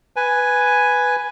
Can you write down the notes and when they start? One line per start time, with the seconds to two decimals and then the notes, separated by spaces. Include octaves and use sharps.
0.16 B4 G#5